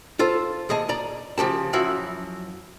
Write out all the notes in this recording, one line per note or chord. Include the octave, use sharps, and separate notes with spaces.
F4 A4 C5
D#2 G#4 D#5 A5
D5 A#5
C#3 F3 G4 A5
F#2 F3 E4 F#4 F5